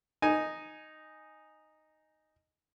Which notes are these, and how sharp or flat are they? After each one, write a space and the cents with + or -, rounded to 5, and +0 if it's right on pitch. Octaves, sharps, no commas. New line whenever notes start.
D#4 -5 G#5 +0